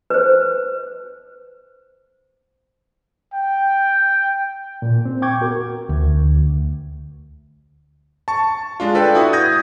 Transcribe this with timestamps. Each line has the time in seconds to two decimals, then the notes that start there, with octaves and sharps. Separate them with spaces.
0.10 B4 C5
3.33 G5
4.82 A#2
5.05 C4
5.22 G5 C#6 D6 G6 G#6
5.41 B3 F#4 A#4
5.89 D2
8.28 A5 C#6
8.80 G#3 D4 F4
8.95 A4 B4 D5 G5
9.15 E4 F#4 D#6
9.33 D#6 G6 G#6 A#6